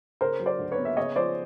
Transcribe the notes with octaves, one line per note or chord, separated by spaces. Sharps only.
C#3 A#4 C5
F#3
C5 D5
D2
B4 C#5
B3
E5
C#3 C#5 D#5
F3 C5 D5